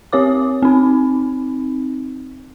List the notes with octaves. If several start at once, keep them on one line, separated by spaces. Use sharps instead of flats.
C4 G4 C#5 D6
C4 D#4